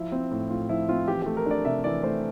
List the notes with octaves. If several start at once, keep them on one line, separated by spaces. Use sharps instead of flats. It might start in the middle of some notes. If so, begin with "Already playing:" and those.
Already playing: F3 E4
C4
A2
A2 F4
F3 E4
C4 F4
E3 G4
A3 G4
A#4
D4 D5
C3 E5
E3 D5
A3 C5